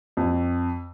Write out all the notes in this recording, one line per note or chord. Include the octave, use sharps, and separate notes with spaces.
F2